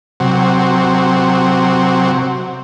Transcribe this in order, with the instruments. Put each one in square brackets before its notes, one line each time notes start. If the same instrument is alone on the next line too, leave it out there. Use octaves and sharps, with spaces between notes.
[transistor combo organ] C3 F#3